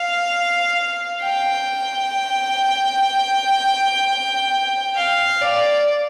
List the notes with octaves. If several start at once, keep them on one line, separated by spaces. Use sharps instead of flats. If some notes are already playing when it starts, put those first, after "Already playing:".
Already playing: F5
G5
F5
D5